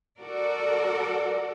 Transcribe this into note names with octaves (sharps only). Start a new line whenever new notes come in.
F#4 A4 A#4 D5